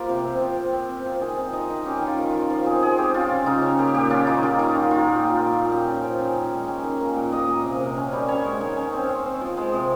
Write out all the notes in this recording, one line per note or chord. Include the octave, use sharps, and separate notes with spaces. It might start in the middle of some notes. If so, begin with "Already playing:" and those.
Already playing: F3 A#3 F4 G4
C3
C4
F3
C4
C4
C4
F3
D#3 G#4
C4
D#3 D#5
D#3
C#4 G4
D#3
F4
D#3
F4
D#3
F3 F4
C4 G#4
F3 G#4
C4 G4
C#4 F4
C#3
C#3 D#4
C#4
A#3 G4
A#2 G4
C#4 F4
A#3 D#4
D#3 F4
D#3 D#4
C#4 F4
A#3 F4
A#2 G4
A#3
A#2
A#2
C#4 G4
C#4
F3
C#4
D#3
G#3
C#4
D#3
A#3
A#2
A#3 D#5
A#2
C3
C3
C#4
G3
C#4 C#5
G#3
D#3
C#4
C4
C4
C4
F3
G#3 C5
C3